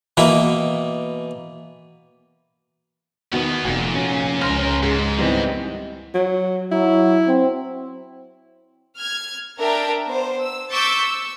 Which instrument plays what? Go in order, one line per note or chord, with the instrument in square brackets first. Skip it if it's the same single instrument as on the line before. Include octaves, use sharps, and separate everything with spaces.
[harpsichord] B2 E3 A#3 E4
[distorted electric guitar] E2 B3 [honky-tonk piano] B2 D#3 F#4
[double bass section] F1 [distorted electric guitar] A#2 [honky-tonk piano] F#4
[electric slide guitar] C#4
[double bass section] C#2 [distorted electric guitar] A#4 C5 [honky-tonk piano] C6 F6
[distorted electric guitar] G#2 [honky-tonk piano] G#3
[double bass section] D#3 E3 [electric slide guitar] G3 B3 C4
[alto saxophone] F#3
[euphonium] F#3 [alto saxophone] E4
[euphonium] C4
[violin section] F6 G#6
D4 A#4 E5 G5
B3 C5
E6
C#6 D6 E6 G6 A6 B6
E6